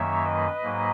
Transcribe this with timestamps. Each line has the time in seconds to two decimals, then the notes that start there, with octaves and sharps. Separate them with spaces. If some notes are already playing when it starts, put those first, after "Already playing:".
Already playing: F#2 D#3 F#3 A#3 C#5 E5
0.24 B4 D#5
0.63 G#2 F#3 A#3